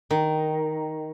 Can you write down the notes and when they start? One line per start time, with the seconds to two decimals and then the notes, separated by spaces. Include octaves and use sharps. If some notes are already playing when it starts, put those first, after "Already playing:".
0.11 D#3